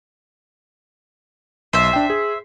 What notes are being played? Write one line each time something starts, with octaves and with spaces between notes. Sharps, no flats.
B1 C5 E5
D4 G5
G#4